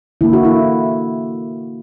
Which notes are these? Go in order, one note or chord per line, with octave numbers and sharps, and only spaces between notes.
D3 A#3 E4
F#4
E4